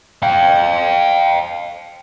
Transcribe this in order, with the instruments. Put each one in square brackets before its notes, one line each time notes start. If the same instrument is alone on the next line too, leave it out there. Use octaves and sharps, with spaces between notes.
[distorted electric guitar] F5 G5